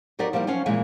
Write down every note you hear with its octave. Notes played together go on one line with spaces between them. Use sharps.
F2 F#3 D#4 G4 A#4 D5
F3 G3 A#3 D#4 E4
F3 F#3 C#4 F5
A#2 E3 F3 G#3 A#3